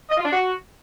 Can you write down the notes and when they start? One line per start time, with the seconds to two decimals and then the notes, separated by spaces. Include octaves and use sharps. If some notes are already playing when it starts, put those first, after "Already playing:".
0.10 D#5
0.17 F4
0.25 D4
0.33 F#4